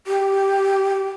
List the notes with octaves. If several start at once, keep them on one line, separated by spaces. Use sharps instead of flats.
G4